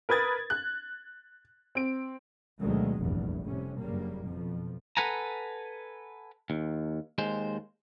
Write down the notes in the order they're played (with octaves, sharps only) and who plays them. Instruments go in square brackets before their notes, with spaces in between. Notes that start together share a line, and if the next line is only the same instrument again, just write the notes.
[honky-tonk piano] A#4 B4 D#6 G#6 A6
F#6
C4 D7
[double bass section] D2 B2 D#3 F#3 G#3
F1 A#1 E2 G2 E3
A2 C3 G3 C#4
F#1 G2 C#3 G3 A#3
F2 B2 F3
[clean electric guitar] A4 B4 F#5 G#5 A#5
D#2
D#2 G#3 C5